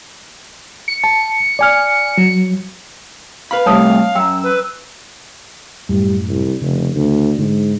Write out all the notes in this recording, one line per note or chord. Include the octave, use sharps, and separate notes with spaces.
C#7
A5
D5 G#5 F6
F#3
B4 F5 B5
C3 G3 A3 C#5 A5 D#6
F#2 G5 A#5 E6
B4
F#2 A2 G3
C2
F1 C#3
D2
G#2 D3